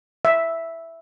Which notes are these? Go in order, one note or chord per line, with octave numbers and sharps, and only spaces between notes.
E5